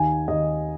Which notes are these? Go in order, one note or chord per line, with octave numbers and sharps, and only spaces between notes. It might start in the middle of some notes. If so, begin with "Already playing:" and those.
Already playing: D#2 G#5
D#2 D#5